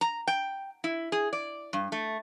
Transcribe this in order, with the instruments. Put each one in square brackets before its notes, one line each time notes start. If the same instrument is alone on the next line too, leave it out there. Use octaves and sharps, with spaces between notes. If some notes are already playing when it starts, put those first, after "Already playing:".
[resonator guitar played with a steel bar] A#5
G5
E4
G#4
D5
G2
A3